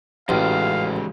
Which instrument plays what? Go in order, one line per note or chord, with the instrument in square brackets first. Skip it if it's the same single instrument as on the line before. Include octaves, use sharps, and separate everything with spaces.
[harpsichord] A1 [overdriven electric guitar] G#2 C#3 [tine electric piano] E3 F#4 G4 [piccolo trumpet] F5